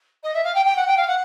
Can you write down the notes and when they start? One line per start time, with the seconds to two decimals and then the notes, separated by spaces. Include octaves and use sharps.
0.23 D#5
0.34 E5
0.44 F5
0.54 G5
0.65 G5
0.76 F#5
0.87 G5
0.97 F5
1.07 F#5